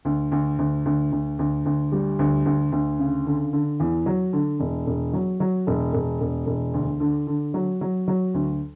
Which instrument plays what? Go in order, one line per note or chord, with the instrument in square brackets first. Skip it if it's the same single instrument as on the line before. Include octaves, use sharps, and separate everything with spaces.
[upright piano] D2
D2
D2
D2
D2
D2
D2
G3
D2
D2
D2
C#3
D3
D3
E2
F#3
D3
E1
E1
F#3
F#3
E1
E1
E1
E1
D2
D3
D3
F#3
F#3
F#3
D2